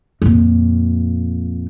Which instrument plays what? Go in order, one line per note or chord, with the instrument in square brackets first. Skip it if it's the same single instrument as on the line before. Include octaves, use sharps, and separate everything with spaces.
[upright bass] F2 A#2